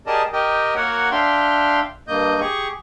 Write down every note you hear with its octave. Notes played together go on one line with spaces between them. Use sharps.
G4 G#4 A#4 D5 D#5 A5
G4 A#4 D#5 G5
A#3 F#4 A#4 C#5 F#5
D4 E5 F5 G5 C6
G2 A#3 D#5 G6
G4 G#4 C#6